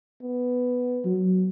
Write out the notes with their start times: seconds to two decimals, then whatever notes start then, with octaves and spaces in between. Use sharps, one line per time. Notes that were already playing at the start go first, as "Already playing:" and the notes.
0.22 B3
1.05 F#3